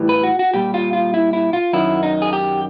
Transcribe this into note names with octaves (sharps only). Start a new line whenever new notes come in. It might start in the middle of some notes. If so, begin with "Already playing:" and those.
Already playing: A2 E3 G3
B4
F#4
F#4
A#2 G3 G4
F4
F4
E4
E4
F4
F#2 D#3 F#3 E4
D#4
G#4
G4